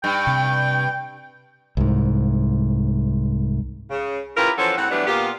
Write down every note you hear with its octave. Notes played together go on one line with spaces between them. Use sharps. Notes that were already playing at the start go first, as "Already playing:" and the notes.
G2 G5
C3
C2 G#2
C#3
C#4 E4 F4 G4 A#4 B4
E3 F3 C#4 F#4 A4 C5
A2 G3 C4 F#5
E3 F#3 G3 A3 B3 D4
A#2 A#3 B3 F4 G4